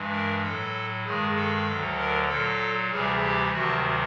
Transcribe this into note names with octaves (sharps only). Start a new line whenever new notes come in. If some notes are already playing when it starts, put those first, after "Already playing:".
Already playing: G2 E3 G#3
A#4
A2 F#3 A4
G2 D#3 G#3 G#4
A4
D2 D3 F#3
A#4
A#2 F#3 A4
D2 C3 E3 G3 G#4
G4
D2 C3 D#3 F#3 F#4